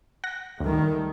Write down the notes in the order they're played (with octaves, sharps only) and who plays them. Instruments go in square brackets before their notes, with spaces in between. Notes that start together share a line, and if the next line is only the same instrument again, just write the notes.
[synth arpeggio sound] F#5 A#6
[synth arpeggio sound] D2 [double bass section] D#3 G3 A3